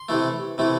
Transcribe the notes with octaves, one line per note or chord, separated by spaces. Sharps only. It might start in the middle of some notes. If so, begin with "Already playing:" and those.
Already playing: C6
C3 E3 A3
C3 E3 A3